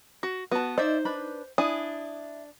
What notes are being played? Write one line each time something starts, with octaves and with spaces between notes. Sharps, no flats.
F#4
B3 F#4 A5
D#4 C5 D5 E5
D4 B4 B5
D4 E4 G#5 D#6